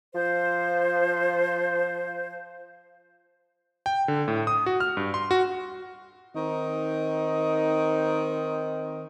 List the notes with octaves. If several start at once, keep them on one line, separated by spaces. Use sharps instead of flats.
F3 C5
G5
D3
A2
D#6
F#4
F6
G2
C6
F#4
D#3 C4 D#4